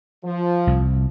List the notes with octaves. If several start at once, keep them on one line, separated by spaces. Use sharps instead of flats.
F3
C2